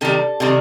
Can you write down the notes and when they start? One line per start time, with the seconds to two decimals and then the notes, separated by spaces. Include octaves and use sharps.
0.01 C3 D#3 G3 A4
0.40 C3 D#3 G3